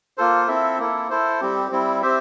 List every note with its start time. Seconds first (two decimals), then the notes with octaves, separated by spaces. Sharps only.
0.17 A#3 F4 A4 C5
0.48 C4 E4 A4 E5
0.79 A#3 E4 A4
1.10 E4 A4 C5
1.41 G3 C4 G4
1.71 G3 C4 E4
2.02 C4 G4 C5 E5